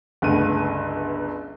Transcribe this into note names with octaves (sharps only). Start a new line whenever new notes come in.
G1 C#2 A3 D#7